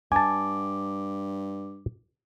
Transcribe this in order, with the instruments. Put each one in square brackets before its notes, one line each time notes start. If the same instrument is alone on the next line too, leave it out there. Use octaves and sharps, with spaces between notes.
[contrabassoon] G2 [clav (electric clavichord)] G#5 A5 [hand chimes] D6